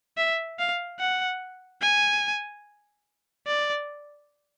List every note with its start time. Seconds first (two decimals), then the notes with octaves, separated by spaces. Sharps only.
0.18 E5
0.59 F5
1.00 F#5
1.82 G#5
3.47 D5